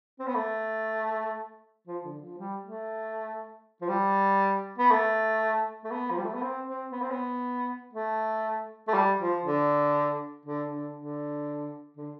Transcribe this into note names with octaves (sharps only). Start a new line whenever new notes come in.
C4
B3
A3
F3
D3
F3
G3
A3
F3
G3
B3
A3
A3
B3
F3
G3
A3
B3
C4
C4
B3
C4
B3
A3
A3
G3
F3
D3
D3
D3
D3
D3